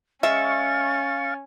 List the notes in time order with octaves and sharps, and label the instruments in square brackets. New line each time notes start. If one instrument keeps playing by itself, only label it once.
[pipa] G#3 E5 [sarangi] C#4 [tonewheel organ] F5 C#6 [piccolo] A6